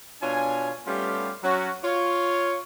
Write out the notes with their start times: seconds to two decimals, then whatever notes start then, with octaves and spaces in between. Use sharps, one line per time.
0.22 B2 D4 F4 C#5 G#5
0.87 G3 A3 B3 C#4 F4 G4
1.43 F#3 C#4 F#4
1.84 F4 C#5